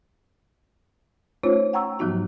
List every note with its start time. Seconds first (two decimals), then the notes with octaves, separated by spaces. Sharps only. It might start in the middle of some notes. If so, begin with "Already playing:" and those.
1.43 A3 C#4 D#4 F4 C5 C#5
1.73 F#5 G5 A#5 C#6 E6
1.99 G#2 F3 F#3 B3 D#4 F#4